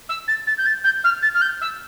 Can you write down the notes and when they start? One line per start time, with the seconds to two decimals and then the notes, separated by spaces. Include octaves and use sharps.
0.09 E6
0.27 A6
0.47 A6
0.58 G6
0.65 A6
0.84 G6
1.04 F6
1.22 A6
1.34 F6
1.41 G6
1.61 E6